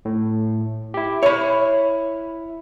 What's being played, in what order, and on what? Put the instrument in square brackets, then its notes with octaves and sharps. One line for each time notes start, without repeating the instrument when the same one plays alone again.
[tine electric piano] A2
E4 G4
[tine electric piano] E4 [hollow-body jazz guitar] C#5 B5